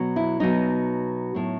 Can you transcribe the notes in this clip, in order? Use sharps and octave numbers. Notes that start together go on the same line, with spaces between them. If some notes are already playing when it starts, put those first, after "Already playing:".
Already playing: B2 F#3
E4
B2 F#3 D#4
A2 F#3